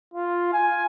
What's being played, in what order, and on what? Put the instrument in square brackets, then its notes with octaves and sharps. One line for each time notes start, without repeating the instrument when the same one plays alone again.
[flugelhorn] F4
G#5